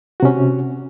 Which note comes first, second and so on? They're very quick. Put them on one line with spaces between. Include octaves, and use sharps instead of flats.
F#4 C3 C#4